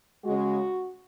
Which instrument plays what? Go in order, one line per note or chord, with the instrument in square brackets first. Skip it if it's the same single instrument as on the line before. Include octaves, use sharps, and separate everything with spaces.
[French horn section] C#3 G#3 F#4